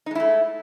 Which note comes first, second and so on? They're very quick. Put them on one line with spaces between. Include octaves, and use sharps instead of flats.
D#4 G#3 E4 A3